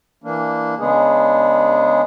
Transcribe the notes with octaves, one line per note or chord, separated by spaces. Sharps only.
E3 A#3 D4
C#3 G#3 B3 D4 G#4